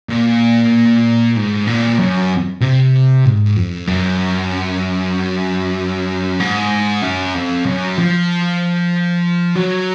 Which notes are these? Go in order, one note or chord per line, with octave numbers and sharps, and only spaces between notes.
A#2
G#2
A#2
F#2
C3
G#2
F2
F#2
G#2
F#2
F2
F#2
F3
F#3